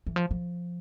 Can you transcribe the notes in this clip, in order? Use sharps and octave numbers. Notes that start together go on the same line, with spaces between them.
E3
F3
F3